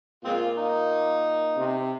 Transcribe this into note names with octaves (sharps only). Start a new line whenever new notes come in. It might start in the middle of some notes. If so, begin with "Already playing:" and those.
A#2 G#3 A#3 C4 F4
D#4
C3 C4